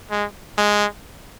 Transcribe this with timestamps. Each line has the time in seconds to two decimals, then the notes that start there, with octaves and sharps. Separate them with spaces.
0.11 G#3
0.58 G#3